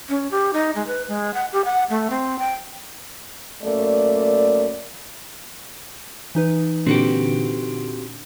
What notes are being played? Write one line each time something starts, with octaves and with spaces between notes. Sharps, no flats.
C#4
G4
D#4
G#3
B4
G#3
F#5
G4
F#5
A3
C4
G5
F#2 A3 A#3 D5
E3 D#4 B4
A#2 D3 C4 F#4 G4